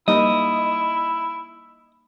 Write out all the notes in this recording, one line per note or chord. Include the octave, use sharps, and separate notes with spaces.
G3 A#3 D#4 E4 D#5